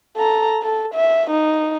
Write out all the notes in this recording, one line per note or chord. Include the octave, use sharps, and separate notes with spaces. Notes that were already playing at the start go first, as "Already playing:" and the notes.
A4 A#5
A4
E5
D#4